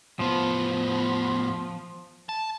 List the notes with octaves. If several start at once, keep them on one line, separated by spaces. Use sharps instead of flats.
A2 F3 B3
A5